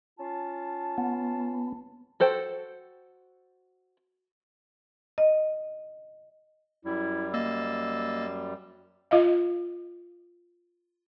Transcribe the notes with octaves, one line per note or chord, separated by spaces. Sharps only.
C#4 F4 A5
B3
F#4 A4 C5 G5
D#5
F#2 G3 E4
A#3 D#5 E6 A6
F4 D#5 F5